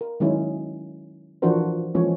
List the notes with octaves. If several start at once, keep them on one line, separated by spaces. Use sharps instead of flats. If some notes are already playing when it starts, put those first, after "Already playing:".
A#4
D#3 F#3 G#3 C#4 E4
E3 F3 D4 F#4 A#4 C5
E3 F3 G#3 A#3 C#4 C#5